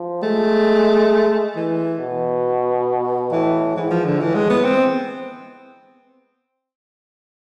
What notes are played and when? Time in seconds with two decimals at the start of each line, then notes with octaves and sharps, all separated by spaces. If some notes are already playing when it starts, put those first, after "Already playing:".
Already playing: F3
0.23 G#3 A3
1.56 E3
1.99 B2
3.32 A2 E3
3.76 G#2 E3
3.91 F3
4.06 D3
4.20 A2 E3
4.35 G#3
4.50 B3
4.64 C4